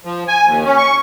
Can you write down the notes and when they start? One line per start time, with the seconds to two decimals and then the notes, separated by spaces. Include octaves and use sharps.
0.05 F3
0.28 G#5
0.45 D#2
0.65 C#4
0.78 C#6